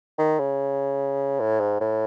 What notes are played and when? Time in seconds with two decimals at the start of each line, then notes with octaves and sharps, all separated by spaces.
0.18 D#3
0.39 C#3
1.40 A2
1.60 G#2
1.81 A2